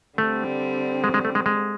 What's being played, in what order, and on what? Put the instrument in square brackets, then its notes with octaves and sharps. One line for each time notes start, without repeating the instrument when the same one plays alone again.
[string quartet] D3 G3 C4 [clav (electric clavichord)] A3
[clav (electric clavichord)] G#3
G#3
A3
G#3
G#3